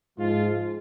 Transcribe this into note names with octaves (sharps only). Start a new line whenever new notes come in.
G#2 F3 G#3 F4